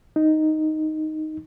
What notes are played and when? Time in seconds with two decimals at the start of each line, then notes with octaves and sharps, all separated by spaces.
0.16 D#4